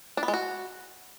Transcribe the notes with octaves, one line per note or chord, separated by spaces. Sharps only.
D4
B3
G#3
F#4